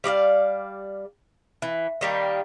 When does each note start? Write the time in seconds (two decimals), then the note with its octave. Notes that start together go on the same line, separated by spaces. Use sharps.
0.04 G3 D5 D#5 F5
1.62 E3
2.01 D#3 G3 A#3